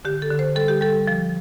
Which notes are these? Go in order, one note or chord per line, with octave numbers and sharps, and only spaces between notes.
D3 G4
A4
D3
C5
G3 A4
G4
G3 A4
F3